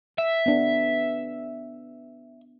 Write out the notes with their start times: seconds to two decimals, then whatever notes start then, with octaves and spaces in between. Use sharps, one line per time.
0.18 E5
0.46 B3 D4 B4